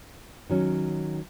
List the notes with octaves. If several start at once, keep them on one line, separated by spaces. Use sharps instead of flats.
D#3 F#3 C#4